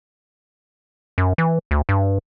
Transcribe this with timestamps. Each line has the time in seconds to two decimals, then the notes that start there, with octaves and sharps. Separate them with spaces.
1.18 F#2
1.38 E3
1.71 D2
1.89 G2